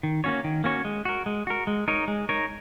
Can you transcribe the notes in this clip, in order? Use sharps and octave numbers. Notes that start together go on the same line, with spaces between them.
D#3
A#3 C#4 F#4 C#5
D#3
A#3 C#4 F#4 C#5
G#3
F#4 A#4
G#3
F#4 A#4
G#3
D#4 A#4 C#5
G#3
D#4 A#4 C#5